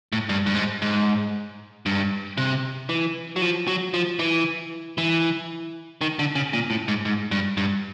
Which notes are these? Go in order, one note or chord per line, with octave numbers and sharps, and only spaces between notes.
A2
G2
G2
G#2
G#2
G2
C3
E3
F#3
F3
F#3
F3
E3
E3
D#3
D3
C#3
A#2
A2
G#2
G#2
G2
G2